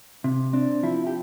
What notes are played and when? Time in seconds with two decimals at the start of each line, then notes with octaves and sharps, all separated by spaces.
0.24 C3
0.53 C4 D4
0.83 F3 E4
1.07 G4